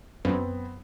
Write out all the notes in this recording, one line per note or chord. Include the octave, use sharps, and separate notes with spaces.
F#2 B3 C4